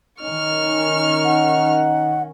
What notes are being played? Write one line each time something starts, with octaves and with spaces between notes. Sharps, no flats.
D#3 C#4 D#4 C#6 F6
F#5